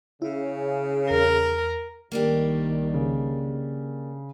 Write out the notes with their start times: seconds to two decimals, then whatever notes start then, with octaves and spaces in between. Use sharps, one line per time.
0.22 C#3 E4
1.10 E2 A#4
2.12 C2 D#3 G3 A#3 D4 G4
2.94 C#3